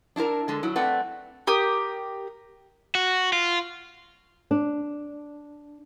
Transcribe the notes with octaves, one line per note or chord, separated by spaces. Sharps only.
D4 E4 F4 A#4
D3 G#3 A4
F#3 E4
A3 C4 B4 D5 F#5
G4 A#4 D#6
F#4
F4
D4